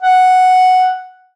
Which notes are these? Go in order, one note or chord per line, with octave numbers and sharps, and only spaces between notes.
F#5